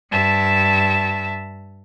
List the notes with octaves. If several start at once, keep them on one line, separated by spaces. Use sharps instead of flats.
G2 E5 A5